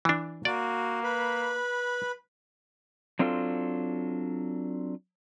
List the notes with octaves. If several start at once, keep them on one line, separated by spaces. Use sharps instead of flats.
E3 D4
A#3 F#4 D5
B4 B5
F#3 C4 D4 F4 A4